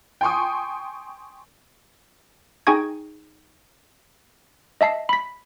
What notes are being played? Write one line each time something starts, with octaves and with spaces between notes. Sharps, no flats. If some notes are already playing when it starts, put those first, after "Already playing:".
G5 G#5 C6 C#6 D#6
D#4 G#4 G5 G#5 C#6 G#6
D#5 E5 A5 C7
B5 B6